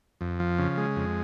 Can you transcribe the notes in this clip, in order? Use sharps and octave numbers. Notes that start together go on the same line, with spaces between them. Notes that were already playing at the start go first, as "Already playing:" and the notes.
F2
F3
C#3
G#3
F2